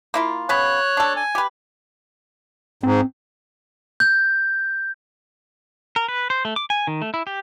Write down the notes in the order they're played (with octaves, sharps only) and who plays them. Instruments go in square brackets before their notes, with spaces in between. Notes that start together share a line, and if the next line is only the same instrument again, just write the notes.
[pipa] A#3 E4 F4
[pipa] C#3 B3 [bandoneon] C#5 F#6
[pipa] D4 A4
[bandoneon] G#5
[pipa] G4 B4
[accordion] G#2 [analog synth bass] C4
[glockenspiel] G6
[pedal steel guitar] A#4
B4
C5
A3
D6
G#5
D#3
A3
E4
G4